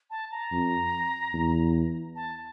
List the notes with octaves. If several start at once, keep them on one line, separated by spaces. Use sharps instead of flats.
A5
A#5
F2
E2
A5